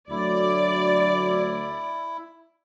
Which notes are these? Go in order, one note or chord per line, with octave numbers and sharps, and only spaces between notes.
D2 F#3 E4 D5